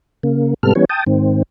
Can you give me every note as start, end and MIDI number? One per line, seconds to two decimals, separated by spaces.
0.23 0.54 49
0.23 0.54 58
0.63 0.73 44
0.63 0.73 48
0.63 0.73 55
0.63 0.73 59
0.63 0.73 69
0.63 0.73 89
0.75 0.85 52
0.75 0.85 55
0.75 0.85 59
0.75 0.85 61
0.75 0.85 73
0.90 1.04 79
0.90 1.04 81
0.90 1.04 87
1.07 1.43 44
1.07 1.43 51
1.07 1.43 60